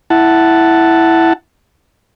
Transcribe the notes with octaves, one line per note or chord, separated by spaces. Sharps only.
E4 F#5 A5